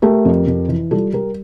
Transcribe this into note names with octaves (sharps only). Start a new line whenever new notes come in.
A3 G4 A#4
F2
F2
E3
G3 F4 A4
G3 G4 A#4